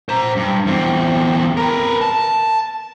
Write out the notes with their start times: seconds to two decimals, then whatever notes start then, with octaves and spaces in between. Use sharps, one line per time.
0.09 C5 A#5
0.36 G2
0.66 E2 C4
1.57 A#4 B4
2.01 A5